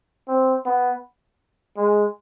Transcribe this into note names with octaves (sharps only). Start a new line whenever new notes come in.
C4
B3
G#3